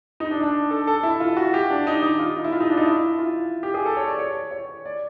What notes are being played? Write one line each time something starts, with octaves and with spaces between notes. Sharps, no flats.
D#4
D4
D4
A4
A4
E4
F4
F#4
G4
D4
D#4
D#4
F4
D#4
E4
F4
D#4
D4
D#4
E4
F4
G4
G#4
A4
C#5
D5
C#5
C#5
D5